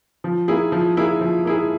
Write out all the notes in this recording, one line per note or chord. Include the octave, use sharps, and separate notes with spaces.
F3
A#3 E4 G#4
F3
A#3 E4 G#4
F3
A#3 E4 G#4